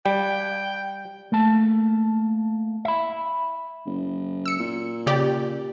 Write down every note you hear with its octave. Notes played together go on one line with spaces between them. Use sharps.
G3 G5
A3 A#3 A5
E5 B5
F#1
E6 C#7
A#2
C#3 G4 D5